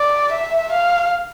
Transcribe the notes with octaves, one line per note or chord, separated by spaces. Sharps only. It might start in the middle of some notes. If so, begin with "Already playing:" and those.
Already playing: D5
E5
F5